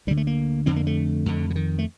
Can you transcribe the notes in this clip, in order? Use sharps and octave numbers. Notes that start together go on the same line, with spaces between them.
D2 D3 G3
A3
A#3
F2 D3 C4
A#3
A3
F2 D3
D3
D#3
A3